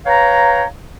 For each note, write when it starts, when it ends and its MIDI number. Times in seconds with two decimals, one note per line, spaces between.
0.06 0.63 71
0.06 0.63 73
0.06 0.63 77
0.06 0.63 79
0.06 0.63 82